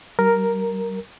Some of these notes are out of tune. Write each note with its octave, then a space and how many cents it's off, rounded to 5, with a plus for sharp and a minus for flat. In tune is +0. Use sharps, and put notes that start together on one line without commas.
G3 -40 A#4 +0